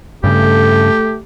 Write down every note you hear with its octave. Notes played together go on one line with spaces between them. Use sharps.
G2 C#3 A3 G4